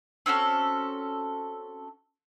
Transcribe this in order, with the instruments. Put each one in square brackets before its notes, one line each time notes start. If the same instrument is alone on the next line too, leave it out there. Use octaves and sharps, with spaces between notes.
[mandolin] C4 C#4 F#4 A4